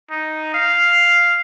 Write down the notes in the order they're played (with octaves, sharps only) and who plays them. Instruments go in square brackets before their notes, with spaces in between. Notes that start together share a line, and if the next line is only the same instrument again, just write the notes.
[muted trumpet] D#4
F5